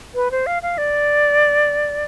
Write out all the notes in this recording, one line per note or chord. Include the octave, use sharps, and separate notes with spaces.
B4
C5
F5
F5
D5